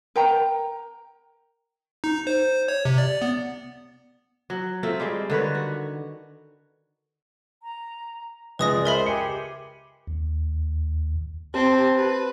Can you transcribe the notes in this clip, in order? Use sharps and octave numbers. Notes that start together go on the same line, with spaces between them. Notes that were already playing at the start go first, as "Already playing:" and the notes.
A#4 G5 A#5
D#4
C5
C#5
C3
D5
B3
F#3
A3 C4 F4 A4
G3 G#3 C4
D3 D#3 B4 C#5
F#4
A#5
C#2 G#3 B4 D5 G#5 D#6 A#6
A#4 C5 D#5 E5 B5
G4 G#4 C#7
D#2
C4 G4 A5
B4